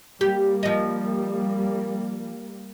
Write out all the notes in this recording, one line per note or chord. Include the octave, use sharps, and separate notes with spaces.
G3 A#3 G4
F3 D#5